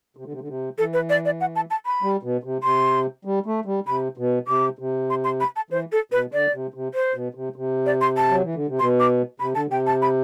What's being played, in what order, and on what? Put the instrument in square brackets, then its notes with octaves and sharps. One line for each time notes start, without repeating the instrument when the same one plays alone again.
[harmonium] C3
D3
C3
D3
C3
[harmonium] E3 [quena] A4
[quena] B4
D5
D5
F#5
A5
A5
B5
[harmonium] G3
B2
C3
[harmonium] C3 [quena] C6
[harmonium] G3
A3
G3
[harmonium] C3 [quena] B5
[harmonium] B2
[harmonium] C3 [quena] D6
[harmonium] C3
[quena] C6
C6
B5
A5
[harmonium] E3 [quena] C5
[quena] A4
[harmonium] B2 [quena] B4
[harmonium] D3 [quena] D5
[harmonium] C3
C3
[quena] C5
[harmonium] B2
C3
C3
[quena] D5
C6
A5
[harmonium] F#3
E3
D3
C3
[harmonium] B2 [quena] C6
[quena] D6
[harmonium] C3 [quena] B5
[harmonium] D3 [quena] A5
[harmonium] C3 [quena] G5
[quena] A5
B5